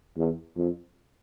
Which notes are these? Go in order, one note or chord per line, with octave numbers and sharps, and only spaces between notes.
E2
F2